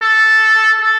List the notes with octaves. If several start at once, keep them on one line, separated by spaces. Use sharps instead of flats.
A4
A4